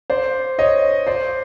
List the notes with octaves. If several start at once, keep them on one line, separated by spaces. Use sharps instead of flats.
C5 D5
C#5 D#5
C5 D5